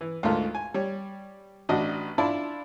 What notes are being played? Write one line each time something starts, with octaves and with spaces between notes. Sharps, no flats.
E3
D2 G#2 A3 F4 A#4
G#5
G3 C#5
A1 D4 F#4 D#5
D4 E4 F4 D5 A5 B5